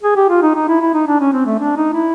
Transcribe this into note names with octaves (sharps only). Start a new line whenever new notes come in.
G#4
G4
F4
D#4
D#4
E4
E4
D#4
D4
C#4
C4
A3
D4
D#4
E4